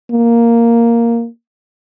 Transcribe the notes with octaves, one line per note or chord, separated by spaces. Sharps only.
A#3